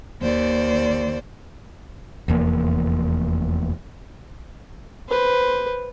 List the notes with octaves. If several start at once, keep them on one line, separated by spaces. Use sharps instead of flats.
D#2 C5 D5
F1 E2 A#3
B4 C5